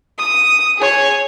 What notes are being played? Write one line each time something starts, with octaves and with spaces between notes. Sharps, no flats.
D#6
G#4 C#5